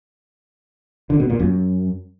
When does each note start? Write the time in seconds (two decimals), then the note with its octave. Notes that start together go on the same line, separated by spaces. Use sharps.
1.10 D3
1.20 B2
1.30 A#2
1.40 F#2